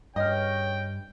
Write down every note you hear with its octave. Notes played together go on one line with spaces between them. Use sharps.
G2 C#3 B4 C#5 D#5 G5 F6